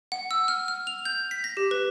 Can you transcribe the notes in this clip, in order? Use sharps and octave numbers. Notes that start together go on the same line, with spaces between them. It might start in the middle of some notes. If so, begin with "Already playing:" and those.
F#5
E6
F6
F6
F7
G6
B6
A#6
G4
B4